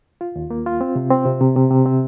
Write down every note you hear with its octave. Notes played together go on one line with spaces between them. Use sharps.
F4
D#2
A#3
F4
C4
C3
C4
C3
C3
C3
C3
C4